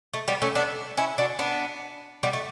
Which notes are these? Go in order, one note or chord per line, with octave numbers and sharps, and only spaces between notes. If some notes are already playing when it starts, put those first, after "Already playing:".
A3
G3 B3
A3 C#4
B3 D4
C#4 E4
D4 F#4
B3 D4
G3 B3
A3